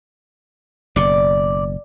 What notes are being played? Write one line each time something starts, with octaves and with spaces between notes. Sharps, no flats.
F#1 B2 D5